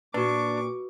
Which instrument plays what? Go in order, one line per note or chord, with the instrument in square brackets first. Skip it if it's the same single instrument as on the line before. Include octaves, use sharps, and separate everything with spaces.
[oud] A#2 [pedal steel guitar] D4 [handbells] F#4 B4 [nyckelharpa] C#6 D6